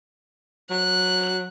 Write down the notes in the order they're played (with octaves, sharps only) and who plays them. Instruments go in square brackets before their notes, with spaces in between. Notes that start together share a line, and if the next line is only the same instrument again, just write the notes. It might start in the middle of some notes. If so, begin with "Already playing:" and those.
[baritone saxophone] F#3 [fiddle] F#6